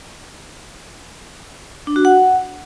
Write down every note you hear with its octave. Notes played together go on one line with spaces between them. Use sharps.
D4
F#4
F#5